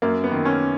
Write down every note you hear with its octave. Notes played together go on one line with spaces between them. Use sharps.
F#2 A#3
B3
D#3
C#4